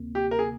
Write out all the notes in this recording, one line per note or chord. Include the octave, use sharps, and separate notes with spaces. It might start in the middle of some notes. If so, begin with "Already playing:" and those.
Already playing: D2 C3 A#3
G4
A#4
G#4